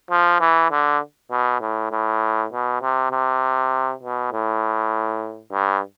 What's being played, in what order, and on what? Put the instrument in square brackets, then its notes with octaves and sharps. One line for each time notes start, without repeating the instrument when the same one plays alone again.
[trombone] F3
E3
D3
B2
A2
A2
B2
C3
C3
B2
A2
G2